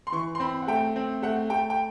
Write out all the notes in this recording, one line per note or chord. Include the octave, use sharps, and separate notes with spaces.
C6
E3 C#6
C6
C4 B5
F#5
A3 G5
C4
A3 F#5
A3 G5
G5